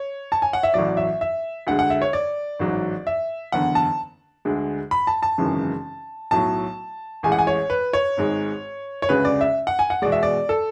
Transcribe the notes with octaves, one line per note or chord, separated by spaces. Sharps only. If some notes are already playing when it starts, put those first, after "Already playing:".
Already playing: C#5
A5
G#5
F#5
E5
A1 A2 F#3 D5
E5
E5
D2 D3 G#3 F#5
F#5
E5
C#5
D5
A1 G#2 F#3
E5
F#1 E2 D3 F#5
A5
D2 D3 G#3
B5
A5
A5
G#1 F#2 C#3 E3 G#3
B1 A2 F#3 A5
A1 A2 G#3 G#5
F#5
G#5
C#5
B4
C#5
G#1 G#2 G#3
C#5
D2 C#3 G#3 B4
D5
E5
F#5
G#5
F#5
E2 B2 G#3 D5
E5
D5
A4